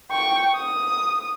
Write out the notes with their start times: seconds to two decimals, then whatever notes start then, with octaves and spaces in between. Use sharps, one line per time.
0.11 G5 C#6
0.56 D#6